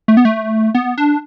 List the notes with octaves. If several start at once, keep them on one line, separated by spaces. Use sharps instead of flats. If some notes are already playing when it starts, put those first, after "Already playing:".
A3
B3
A3
B3
D4